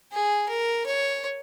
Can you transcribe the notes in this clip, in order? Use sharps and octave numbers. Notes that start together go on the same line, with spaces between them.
G#4
A#4
C#5